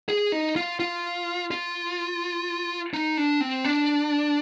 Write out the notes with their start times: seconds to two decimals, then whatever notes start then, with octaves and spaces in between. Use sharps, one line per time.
0.09 G#4
0.32 D#4
0.56 F4
0.80 F4
1.51 F4
2.94 D#4
3.17 D4
3.41 C4
3.64 D4